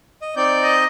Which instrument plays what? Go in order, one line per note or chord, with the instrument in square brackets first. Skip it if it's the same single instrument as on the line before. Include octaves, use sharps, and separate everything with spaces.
[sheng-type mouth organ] D#5
[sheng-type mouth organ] C4 D#4 G6 [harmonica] D5
[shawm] D#5